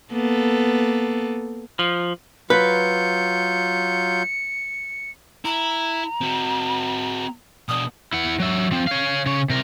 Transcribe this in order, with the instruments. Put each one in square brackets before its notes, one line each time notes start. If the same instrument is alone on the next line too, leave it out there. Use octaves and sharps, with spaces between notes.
[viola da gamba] A#3 B3 A4
[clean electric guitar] F3
[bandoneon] F#3 F4 G6 [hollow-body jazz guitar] B4 [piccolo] C#7
[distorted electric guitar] E4 [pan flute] A#5
[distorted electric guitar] C4 F#4
[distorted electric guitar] B2 D4 [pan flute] D#6
[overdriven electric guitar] E4 F#5
F#3 E5
F3 C4
C#5 F5
C#3 C#5
C3 A#4